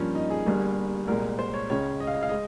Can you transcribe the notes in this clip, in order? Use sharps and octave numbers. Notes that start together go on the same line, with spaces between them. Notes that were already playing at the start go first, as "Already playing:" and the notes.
Already playing: G2 F3 A#3 C#4
D#4
G#4
G1 G2 G3 A#3
C2 A#2 G#3 A#4
C5
C#5
C#2 C#3 G#3 C#5
D#5
F5
D#5
F5
G#3 D#5